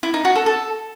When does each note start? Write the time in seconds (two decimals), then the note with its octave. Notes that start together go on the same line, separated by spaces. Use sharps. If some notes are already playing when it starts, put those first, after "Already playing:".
0.03 E4
0.14 D#4
0.25 F#4
0.35 A4
0.46 A4